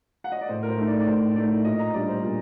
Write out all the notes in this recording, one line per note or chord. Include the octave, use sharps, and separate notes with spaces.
F#5
D#5
D5
A2 C5
A#4
C5
A3 D#4
D5
D5
A2 C5
A3 D#4 D5
A#2 D#5
A#5
G3 D4 D5
C5
A#2 A#4